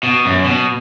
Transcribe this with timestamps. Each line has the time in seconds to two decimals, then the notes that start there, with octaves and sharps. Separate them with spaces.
0.03 B2
0.26 F#2
0.44 B2